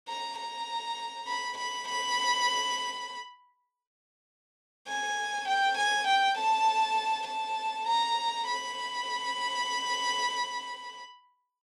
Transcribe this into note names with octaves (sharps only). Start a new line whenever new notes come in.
A#5
A#5
B5
B5
B5
G#5
G5
G#5
G5
A5
A5
A#5
B5